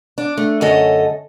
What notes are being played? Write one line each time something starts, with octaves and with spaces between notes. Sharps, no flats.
D4
A3
F#2 D3 C#4 A4 D#5